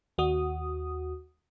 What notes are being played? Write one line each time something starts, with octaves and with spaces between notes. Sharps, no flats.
D#2 F#4 D#6